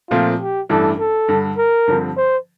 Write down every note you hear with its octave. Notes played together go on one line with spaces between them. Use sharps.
A#2 F3 A3 C4 F4
G4
A1 G2 E3 A3 D4 A4
A4
G2 D3 G3
A#4
G2 D3 F3 C4
C5